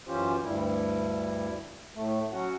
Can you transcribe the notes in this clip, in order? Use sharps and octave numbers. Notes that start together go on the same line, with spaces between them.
F#2 E3 C#4 F4 G4 C5
D2 G2 G3 E4
A2 A3
F#3 C#4 F#4 F#5